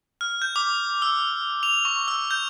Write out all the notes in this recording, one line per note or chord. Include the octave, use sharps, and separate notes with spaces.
F6
G6
D6
E6
F7
C#6
E6
G6